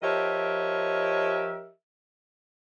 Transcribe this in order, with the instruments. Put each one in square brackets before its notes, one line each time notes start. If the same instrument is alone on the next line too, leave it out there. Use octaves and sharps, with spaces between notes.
[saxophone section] F3 G4 A#4 C#5 D#5 E5